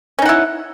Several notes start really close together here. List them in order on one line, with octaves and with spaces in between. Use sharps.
C#4 D#4 F#5 E4